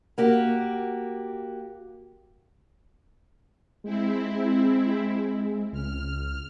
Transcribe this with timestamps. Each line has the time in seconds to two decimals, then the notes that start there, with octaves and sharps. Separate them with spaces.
0.18 A#3 F#4 G4
3.84 G#3 C4 E4
5.72 C#2 F6